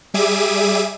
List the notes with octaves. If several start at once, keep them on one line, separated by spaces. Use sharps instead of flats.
G3 G#4 E5 D6 D#7